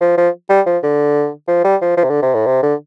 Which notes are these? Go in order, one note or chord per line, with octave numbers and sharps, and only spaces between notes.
F3
F3
G3
F3
D3
F3
G3
F3
F3
C3
D3
C3
A2
C3
D3